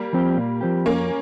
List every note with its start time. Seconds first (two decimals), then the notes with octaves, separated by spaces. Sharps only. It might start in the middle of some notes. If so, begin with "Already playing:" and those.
Already playing: G3 A#3
0.13 F3 C4 G4
0.37 A#2
0.61 F3 C4 G4
0.85 F2 A#3 C#4